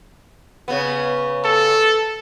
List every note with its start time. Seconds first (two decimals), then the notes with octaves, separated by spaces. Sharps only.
0.68 C#3 B3
1.45 A4